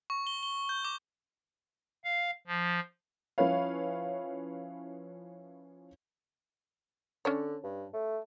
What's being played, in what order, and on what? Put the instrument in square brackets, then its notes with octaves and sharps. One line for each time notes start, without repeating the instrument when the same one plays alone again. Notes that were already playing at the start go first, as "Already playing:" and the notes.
[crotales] C#6
G7
G7
G6
D6
[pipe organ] F5
F3
[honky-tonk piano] F3 C#4 E4 B4 C#5 F5
[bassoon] D3 [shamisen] C#4 D4 C#5
[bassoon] G2
A3